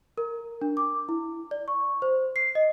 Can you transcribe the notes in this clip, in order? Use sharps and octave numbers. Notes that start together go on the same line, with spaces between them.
A#4
D4
D6
E4
D5
C#6
C5
C7
D#5